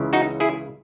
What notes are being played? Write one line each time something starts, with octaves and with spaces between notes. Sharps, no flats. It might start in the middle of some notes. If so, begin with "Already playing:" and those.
Already playing: C#2 C#3 E3
D#4 F#4
E4 G#4